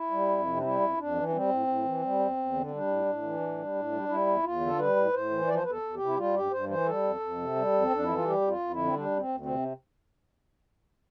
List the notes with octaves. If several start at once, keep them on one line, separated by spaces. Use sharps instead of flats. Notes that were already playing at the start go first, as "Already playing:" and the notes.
Already playing: E4
G3
F2
C3
D4
G3 E4
F2
F2 D4
E3
D4
G3 C4
A2
A2
E3
G3
E2
E2
D3
C4
G3 D4
A2
A2
E3
A2
G3
A2
G3
G3 E4
E2
E2 F4
D3
A4
G3 B4
A2
A2 C5
E3
F3 D5
C5
E2 B4
A4
E2
G4
C3
E4
G3 F4
G2 G4
G2 C5
E3 C5
G3 A4
F2
F2
C3
G3
F2
C4
F2 D4
E3 E4
F4
G3 G4
F2
F4
F2
E4
D3
C4
G3 D4
D2
C4
D2
C4
C3